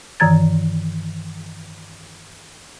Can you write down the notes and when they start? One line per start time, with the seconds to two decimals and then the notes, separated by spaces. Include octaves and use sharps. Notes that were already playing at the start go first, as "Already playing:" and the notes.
0.20 G2 D#3 E3 A#5 G#6 A6